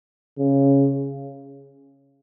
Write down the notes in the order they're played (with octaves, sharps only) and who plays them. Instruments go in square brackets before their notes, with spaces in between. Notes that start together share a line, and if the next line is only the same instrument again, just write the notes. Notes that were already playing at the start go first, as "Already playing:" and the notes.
[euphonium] C#3